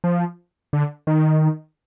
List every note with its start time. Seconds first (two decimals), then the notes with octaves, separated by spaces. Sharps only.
0.04 F3
0.73 D3
1.07 D#3